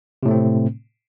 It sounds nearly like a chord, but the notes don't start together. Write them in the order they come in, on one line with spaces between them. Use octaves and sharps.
C3 A2 A3 C4